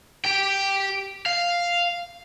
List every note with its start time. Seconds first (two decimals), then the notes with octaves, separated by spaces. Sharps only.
0.25 G4 G5
1.26 F5